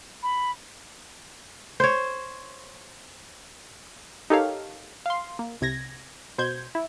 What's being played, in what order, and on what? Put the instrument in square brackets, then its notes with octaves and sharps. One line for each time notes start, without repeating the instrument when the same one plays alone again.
[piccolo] B5
[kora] C5 C#5
[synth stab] D#4 G4 A4 A#4 C#5 F5
F5 C6
A#3
C2 C3 G#6 A#6
B2 C5 G6 G#6
E4